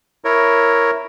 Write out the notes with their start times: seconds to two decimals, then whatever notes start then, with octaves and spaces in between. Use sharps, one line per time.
0.25 E4 A#4 C#5